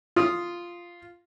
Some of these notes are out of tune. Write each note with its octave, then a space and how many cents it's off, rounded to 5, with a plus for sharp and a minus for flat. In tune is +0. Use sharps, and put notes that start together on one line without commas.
F4 -5 D#6 +0